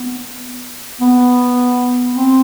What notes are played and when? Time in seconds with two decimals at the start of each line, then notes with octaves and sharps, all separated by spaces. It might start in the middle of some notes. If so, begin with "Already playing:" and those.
Already playing: B3
1.01 B3
2.14 C4